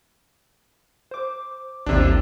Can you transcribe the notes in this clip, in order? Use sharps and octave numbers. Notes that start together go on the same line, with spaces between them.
C5 D6
A1 D#2 C3 D4